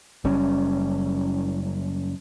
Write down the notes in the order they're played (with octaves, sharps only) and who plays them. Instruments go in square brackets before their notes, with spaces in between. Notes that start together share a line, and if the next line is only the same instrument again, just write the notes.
[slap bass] F#1 G3 C#4